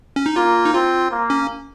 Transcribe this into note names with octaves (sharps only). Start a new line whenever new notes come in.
C#4
D#4
A#3 F4
D#4
C4 F4
A#3
C#4